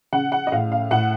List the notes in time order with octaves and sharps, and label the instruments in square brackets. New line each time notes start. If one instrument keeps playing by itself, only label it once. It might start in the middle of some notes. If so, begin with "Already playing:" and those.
[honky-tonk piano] C#3 F#5
F#5
D#5
A2 F5
F5
A2 F#5